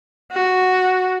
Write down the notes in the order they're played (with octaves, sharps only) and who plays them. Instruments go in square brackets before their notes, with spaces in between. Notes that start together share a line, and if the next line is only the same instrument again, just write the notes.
[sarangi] F#4